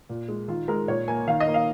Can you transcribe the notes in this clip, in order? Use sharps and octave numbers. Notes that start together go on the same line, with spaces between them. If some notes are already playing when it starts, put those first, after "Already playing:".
A#2
G#3
D#3 F4
G#3 A#4
A#2 C#5
A#3 G#5
D#3 F5
D#5
A#3
F5